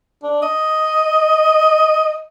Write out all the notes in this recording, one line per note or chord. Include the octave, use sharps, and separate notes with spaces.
D4
D#5